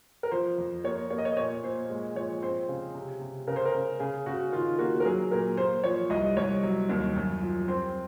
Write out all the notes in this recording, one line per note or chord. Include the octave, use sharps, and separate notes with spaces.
A#4
F3 C5
F2
A#3 C#5
A#3 C#5
D#5
C#5
A#2 C#5
A#2 C5
G#3
F3 C#5
C4 C5
C#3
C3
C3
C#3 A#4
C5
A#4
C#3
C#3 G#4
C#3 F#4
D#3 F4
A#3 F#4
A#4
F#3 G#4
A#2 A#4
A#3 C5
F3 C#5
C2 D#5
C2 C#5
F#3
D#2
F#2
F3
C4 C5